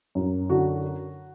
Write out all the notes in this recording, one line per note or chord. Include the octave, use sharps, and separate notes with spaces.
F#2
D3 F#4